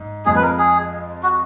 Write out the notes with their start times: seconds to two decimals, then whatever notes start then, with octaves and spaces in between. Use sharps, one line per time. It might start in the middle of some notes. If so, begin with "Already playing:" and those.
Already playing: G#2
0.25 F2 F3 G#3 G#4
0.36 B4
0.42 A#4
0.58 G#4
1.23 F#4